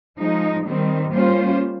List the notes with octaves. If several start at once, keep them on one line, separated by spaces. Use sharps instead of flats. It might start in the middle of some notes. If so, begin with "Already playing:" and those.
F3 G#3 D#4
D#3 G3 C4
G3 A#3 C#4 F4 C5